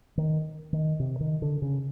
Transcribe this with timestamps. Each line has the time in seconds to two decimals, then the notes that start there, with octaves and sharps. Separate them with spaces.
0.18 D#3
0.73 D#3
1.00 C3
1.20 D#3
1.42 D3
1.62 C#3